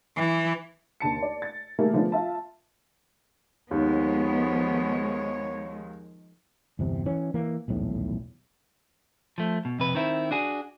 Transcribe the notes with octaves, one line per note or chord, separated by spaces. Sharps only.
E3
D#2 D3 A5 C#7
D5
A6
D#3 G3 A3 A#3 G#4
D3 F3 G#3 A3 B3 D4
F4 E5 A5
D#2 D#3 F3 G#3 B3 C#5
G1 E2 C3
E3 C#4
E3 A#3
D#1 B1 E2 A2
F3 A3
B2
F2 C3 B4
D#3 C4 E4
D4 F#4 G#4